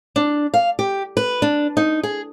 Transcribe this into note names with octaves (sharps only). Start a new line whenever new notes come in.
D4
F5
G4
B4
D4
D#4
G#4